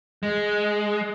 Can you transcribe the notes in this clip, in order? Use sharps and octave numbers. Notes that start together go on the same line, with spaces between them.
G#3